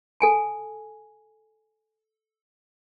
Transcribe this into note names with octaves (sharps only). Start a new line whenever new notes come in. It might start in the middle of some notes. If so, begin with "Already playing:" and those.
A4 G#5 A5